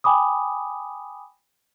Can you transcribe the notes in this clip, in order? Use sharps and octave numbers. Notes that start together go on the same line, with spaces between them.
G5 G#5 B5 D6 D#6